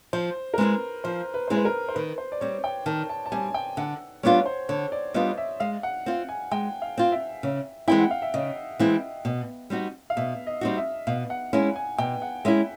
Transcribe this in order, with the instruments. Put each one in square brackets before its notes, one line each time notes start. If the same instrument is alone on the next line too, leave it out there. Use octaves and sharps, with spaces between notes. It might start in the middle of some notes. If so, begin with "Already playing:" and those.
[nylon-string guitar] F3 [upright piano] C5
[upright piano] A#4
[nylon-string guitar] G#3 C4 E4 G#4 [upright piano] B4
[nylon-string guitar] F3 [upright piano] C5
[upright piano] B4
[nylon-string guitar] G#3 C4 E4 G#4 [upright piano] C5
[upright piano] B4
A#4
C5
[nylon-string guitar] D#3 [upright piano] B4
[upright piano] C5
D5
[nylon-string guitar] G3 C4 [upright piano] C#5
[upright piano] G5
[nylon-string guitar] D#3 [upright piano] A5
[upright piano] A5
A5
[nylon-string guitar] G3 C4 [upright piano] G#5
[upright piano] G5
[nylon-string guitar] D3 [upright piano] F#5
[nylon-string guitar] G3 B3 D4 F4 [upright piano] C#5
[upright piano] C5
[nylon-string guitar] D3 [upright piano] C#5
[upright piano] D5
[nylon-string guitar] G3 B3 D4 F4 [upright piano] D#5
[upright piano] E5
[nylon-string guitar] G#3 [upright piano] F5
[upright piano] F#5
[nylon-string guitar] C4 F4
[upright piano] G#5
[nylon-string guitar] G#3 [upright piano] G5
[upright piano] F5
[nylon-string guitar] C4 F4
[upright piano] E5
[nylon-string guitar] C#3
[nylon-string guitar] E3 G#3 C4 E4 [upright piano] G5
[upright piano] F#5
F5
E5
[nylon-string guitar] C#3 [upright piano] D#5
[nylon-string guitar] E3 G#3 C4 E4
B2
G3 C4 D#4 F#4
[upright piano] F5
[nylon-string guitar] B2 [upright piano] E5
[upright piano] D#5
[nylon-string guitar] G3 C4 D#4 F#4
[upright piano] E5
[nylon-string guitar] B2 [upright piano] F5
[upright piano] F#5
[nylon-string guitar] G#3 C#4 E4 [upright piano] G#5
[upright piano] G#5
[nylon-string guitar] B2 [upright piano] G5
[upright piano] F#5
[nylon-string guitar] G#3 C#4 E4 [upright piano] E5